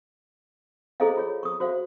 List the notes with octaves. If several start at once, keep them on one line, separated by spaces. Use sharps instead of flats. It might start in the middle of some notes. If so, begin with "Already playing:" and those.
E4 G#4 A4 C5 D#5 F5
F4 G#4 C#5
C#6 D#6
F#4 C5 E5 F5